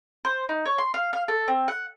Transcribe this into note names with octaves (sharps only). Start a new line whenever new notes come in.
C5
D#4
C#5
C6
F5
F5
A4
C4
F#5